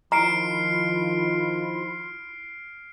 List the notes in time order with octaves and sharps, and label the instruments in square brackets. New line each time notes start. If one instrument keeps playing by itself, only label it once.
[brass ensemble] D#3 F3 [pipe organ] E4 F4 [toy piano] A#5 [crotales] F6 C7 D7